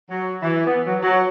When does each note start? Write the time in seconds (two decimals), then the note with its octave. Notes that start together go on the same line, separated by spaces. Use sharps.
0.10 F#3
0.42 E3
0.67 B3
0.87 F#3
1.03 F#3